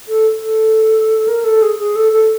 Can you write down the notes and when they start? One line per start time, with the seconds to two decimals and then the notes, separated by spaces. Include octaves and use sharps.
0.08 A4
0.43 A4
1.28 A#4
1.44 A4
1.62 G#4
1.79 G#4
1.96 A4
2.13 A4